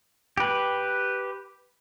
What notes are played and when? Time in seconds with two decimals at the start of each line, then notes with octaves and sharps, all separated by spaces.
0.37 G4 B4